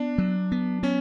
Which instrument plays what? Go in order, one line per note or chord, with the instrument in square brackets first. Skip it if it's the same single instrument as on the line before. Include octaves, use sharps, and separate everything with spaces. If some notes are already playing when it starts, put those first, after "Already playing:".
Already playing: [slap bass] B3 [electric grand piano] D4
[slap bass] F#3
B3
[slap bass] B3 [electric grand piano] C#4